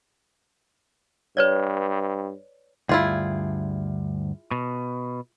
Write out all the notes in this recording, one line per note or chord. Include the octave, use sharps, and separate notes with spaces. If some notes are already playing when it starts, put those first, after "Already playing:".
G2 B4 C#5 D5
D2 G2 E4 F4 G#4
B2